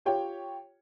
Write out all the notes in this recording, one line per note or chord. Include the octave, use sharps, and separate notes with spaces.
F4 G4 C#5 G5